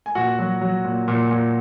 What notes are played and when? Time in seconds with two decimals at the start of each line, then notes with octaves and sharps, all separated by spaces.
0.06 G#5
0.15 A#2 F#4 F#5
0.39 F#3
0.61 F#3
0.85 A#2
1.08 A#2
1.31 A#2